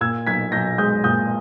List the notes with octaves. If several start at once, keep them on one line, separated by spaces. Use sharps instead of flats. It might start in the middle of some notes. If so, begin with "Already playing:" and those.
A#2 E6 G#6
B1 G#6 B6
B1 G6 A#6
G#3 D#6 G6
A#2 D#6 G6